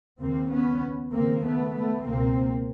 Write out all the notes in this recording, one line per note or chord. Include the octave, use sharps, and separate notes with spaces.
D#2 C#3 A#3 C4
B3 C#4
D#2 C#3 A#3 C4
A3 B3
A3 B3
C#2 B2 A#3 C4